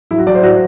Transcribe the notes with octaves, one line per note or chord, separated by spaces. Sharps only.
F#3 E4
F#4
F#3 D5
C5
F#4